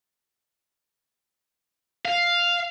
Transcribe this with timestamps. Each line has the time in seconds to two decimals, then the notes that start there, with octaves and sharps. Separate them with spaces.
2.05 F5